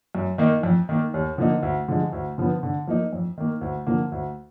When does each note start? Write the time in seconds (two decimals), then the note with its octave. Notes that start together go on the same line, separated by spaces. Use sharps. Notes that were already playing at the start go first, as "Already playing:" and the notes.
0.15 F#2
0.38 D#3 A#3 D#4
0.63 F2
0.89 D#3 A#3
1.14 D#2
1.38 D3 F3 A#3 D#4
1.63 D2
1.88 D3 F3 G#3
2.13 D2
2.38 D3 F3 B3
2.63 D3
2.87 F3 A#3 D#4
3.13 F2
3.38 D#3 A#3
3.61 D2
3.87 D3 F3 A#3
4.12 D2